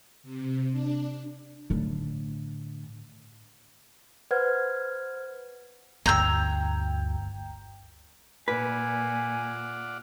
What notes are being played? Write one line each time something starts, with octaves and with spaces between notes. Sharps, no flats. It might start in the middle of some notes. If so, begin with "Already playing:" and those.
C3
D4
A2 D3
B4 C5 F#5 F6 G#6
G1 D2 G5 A#5 E6 G6 G#6
A#2 F4 B4 D5 F#5 G#5